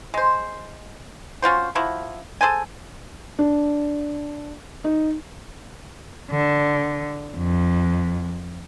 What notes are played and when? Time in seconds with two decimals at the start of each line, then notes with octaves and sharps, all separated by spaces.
0.14 G#3 C5
1.42 C#4 F4 F#4 C5
1.75 F3 E4 F#4
2.41 G#4 A4 C5 G#5
3.39 D4
4.84 D#4
6.31 D3
7.37 F2